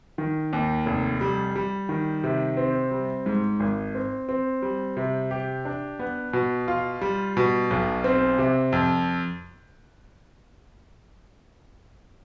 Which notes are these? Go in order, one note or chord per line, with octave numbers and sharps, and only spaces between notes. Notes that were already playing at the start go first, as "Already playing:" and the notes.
D#3
D#2
F1
G3
G3
D#3
C3
C4
G3
G#2
G#1
C4
C4
G3
C3
G4
D4
B3
B2
F4
G3
B2
B1
C4
C3
F2